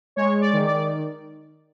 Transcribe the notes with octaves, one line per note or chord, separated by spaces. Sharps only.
G#3 C#5
D5
D#3
D5